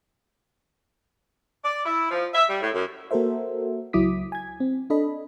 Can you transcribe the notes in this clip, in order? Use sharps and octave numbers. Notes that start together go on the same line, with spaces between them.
D5
E4
F3
E5
G3
A2
F#2
A#3 F#4 A4 A#4 C5 E5
C#2 F#3 E4 D6 D#6 B6
G#5 G#6
C4
D4 A4 D#5 B5